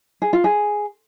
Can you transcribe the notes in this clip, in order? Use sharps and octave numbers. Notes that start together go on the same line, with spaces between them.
G#4
F4
G#4